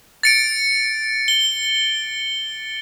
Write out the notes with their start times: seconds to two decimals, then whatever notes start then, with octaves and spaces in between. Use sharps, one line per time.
0.23 A6 C#7 D7
1.28 G7